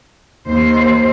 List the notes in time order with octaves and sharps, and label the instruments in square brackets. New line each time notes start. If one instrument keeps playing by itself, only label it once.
[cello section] D#2 C5